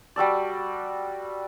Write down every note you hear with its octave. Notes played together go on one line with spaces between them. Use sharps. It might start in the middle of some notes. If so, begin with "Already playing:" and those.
G3 F#4 A4 D5